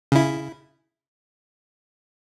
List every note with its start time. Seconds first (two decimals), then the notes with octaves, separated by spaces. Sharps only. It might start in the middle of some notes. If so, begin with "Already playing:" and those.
0.12 C#3 E4